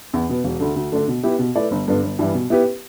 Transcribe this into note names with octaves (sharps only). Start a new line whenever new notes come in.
E2
B2 B3
E1
D2 D3
D2
D3 A3 D4
B2
B3 E4 G4 B4
B2
A3 E4 B4 D5
G1
G2 D3 B3 D4
G1
G2 E3 G3
B2
B3 E4 G4 B4